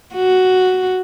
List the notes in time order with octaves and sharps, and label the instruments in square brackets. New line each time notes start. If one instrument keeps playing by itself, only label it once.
[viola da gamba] F#4